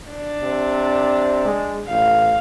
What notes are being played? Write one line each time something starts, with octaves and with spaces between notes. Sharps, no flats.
D4
C3
G#3
A1 F5